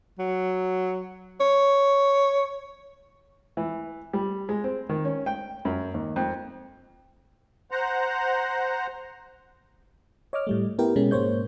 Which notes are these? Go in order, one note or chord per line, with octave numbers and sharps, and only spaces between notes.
F#3
C#5
E3
G3
G#3
C4
D#3
C#4
G5
F#2
D#2
F2
C5 F#5 A#5
C#5 D#5 D6 F6
A2 G3 A3
B3 E4 G4 A#4 G5
B2 G#3 C#4
G#2 A#3 C5 C#5 G6